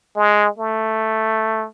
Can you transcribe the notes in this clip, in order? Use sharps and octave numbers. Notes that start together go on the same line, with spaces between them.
G#3
A3